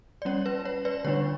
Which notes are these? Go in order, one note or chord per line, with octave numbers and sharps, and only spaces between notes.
D5
G3 C#4 C#5
B4
C#5
B4 D5
D3 G3 D4 C#5